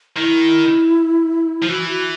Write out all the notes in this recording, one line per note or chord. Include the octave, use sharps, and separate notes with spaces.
D#3 E4
F3
E3 F#4
F#4